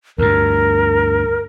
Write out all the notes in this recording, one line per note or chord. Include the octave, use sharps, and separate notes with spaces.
D2 G2 A#4